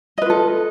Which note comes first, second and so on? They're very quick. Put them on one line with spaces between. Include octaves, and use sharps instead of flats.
D#5 B4 F4 A4